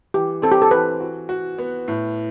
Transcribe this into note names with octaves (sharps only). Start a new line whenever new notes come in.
E3 G4
C4 A4
G4
A4
E3 B4
F#4
F#4
B3
A2